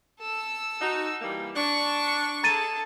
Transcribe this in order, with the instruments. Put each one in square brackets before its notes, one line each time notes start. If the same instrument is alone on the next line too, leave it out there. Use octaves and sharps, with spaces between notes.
[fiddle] A4 E6
[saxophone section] D#4 F#4
E3 G3 A#3
[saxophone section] D4 [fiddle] C#6
[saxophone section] G#4 [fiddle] A4 [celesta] A#5 A6 D#7